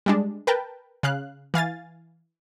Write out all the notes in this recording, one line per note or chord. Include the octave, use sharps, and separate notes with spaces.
G3 G#3 D4
A#4 B4 G5 A5
C#3 F5 F#6
E3 F5 G#5 A6